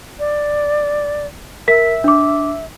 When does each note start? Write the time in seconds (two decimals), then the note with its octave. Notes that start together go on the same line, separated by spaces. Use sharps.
0.19 D5
1.68 A#4 E5 B6
2.04 D4 D6